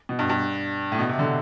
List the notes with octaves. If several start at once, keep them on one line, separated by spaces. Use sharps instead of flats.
B2
G2
G2
A2
B2
C3
D3